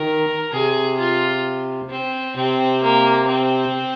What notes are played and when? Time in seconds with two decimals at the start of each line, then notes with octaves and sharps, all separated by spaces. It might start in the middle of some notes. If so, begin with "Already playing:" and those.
Already playing: D#3 A#4
0.52 C3 G#4
0.99 F4
1.90 C4
2.36 C3 C4
2.82 A#3
3.28 C4